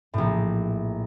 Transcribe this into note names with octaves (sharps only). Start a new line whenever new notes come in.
A#1 A2